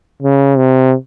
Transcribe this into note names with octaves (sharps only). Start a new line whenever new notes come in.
C#3
C3